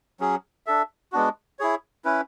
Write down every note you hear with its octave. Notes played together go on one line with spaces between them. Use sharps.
F#3 C#4 G#4
D4 A4 E5
G#3 B3 D4 F#4
E4 G#4 C#5
C#4 E4 B4